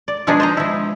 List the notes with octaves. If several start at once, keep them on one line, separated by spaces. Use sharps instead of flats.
D5
B2 F3 G#3 D4 D#4 G#4
C5 D#5 A#5
F3 E4